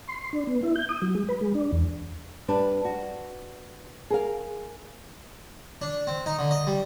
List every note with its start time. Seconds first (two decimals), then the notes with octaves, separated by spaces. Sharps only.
0.08 C6
0.33 D4
0.47 B3
0.63 E4
0.76 G6
0.89 D#6
1.02 F#3
1.15 G#3
1.29 B4
1.41 G#3
1.55 D4
1.72 E2
2.48 G3 D4 B4
2.85 F#4
4.10 G#4 A#4 F5
5.82 D4
6.07 C4
6.26 D#4
6.39 D3
6.51 D#5
6.67 G3